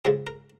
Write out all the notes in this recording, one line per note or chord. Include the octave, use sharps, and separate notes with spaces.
F2 C#3 F3 G#3 G#4
A#4